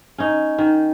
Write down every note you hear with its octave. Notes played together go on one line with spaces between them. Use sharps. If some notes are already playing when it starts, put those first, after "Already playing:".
C#4 D#4
D#3